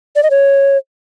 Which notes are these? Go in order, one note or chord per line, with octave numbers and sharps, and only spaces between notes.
D5
D#5
C#5